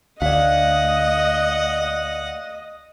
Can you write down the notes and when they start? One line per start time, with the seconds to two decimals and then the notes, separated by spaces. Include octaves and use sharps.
0.22 D2 D5 D#5 F5 F#5